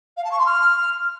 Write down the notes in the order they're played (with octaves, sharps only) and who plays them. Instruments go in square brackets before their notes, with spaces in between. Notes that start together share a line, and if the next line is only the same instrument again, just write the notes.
[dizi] F5
A5
C#6
C6
F6